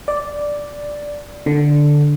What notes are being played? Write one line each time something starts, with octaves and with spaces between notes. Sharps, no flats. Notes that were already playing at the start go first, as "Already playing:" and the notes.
D5
D3